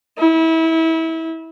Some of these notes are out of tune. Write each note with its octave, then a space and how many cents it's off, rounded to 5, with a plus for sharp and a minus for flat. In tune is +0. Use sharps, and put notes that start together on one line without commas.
E4 -25